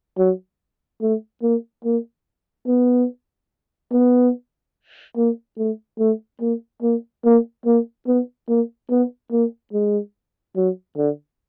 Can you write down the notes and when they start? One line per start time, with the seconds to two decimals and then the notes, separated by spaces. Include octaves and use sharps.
0.18 F#3
1.01 A3
1.42 A#3
1.85 A#3
2.67 B3
3.92 B3
5.17 A#3
5.57 A3
5.99 A3
6.41 A#3
6.82 A#3
7.25 A#3
7.66 A#3
8.07 B3
8.48 A#3
8.90 B3
9.32 A#3
9.73 G#3
10.56 F#3
10.97 D3